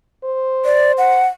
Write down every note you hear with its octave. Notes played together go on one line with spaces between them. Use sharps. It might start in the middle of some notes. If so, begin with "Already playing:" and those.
C5
D5
F#5